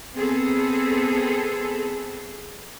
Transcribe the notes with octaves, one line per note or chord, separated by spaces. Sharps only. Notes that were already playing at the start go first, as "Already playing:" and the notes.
B3 C4 G#4 A4